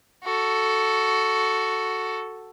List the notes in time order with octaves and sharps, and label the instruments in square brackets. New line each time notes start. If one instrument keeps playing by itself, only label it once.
[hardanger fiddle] F#4 A4